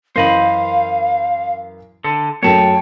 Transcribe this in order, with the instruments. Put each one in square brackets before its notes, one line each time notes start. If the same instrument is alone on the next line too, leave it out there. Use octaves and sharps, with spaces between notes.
[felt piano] F#2 E3 [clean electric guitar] C5 D#5 B5 [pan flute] F5
[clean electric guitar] D3 A4
[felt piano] F#2 F#3 A3 [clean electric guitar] C#5 A5 [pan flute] G5